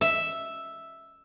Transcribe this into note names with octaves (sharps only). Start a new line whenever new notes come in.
E5